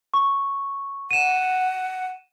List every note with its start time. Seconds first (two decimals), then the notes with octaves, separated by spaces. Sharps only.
0.14 C#6
1.11 F#5 D#7 E7